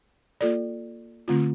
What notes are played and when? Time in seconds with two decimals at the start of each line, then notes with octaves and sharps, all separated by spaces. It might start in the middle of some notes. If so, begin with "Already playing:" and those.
0.41 A#3 F4 A4 D5
1.28 D3 A3 C4 F4